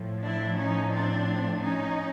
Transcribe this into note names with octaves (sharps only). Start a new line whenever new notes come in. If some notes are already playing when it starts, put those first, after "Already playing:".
Already playing: A2 F3
D4 E4
C#4 D#4
C4 D4
C#4 D#4